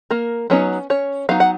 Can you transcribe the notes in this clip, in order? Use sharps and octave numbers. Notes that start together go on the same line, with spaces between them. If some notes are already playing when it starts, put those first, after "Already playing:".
A#3 A#4
F#3 B3 C#4 D#4 C#5
C#4 C#5
F#3 B3 D#4 F5
F#5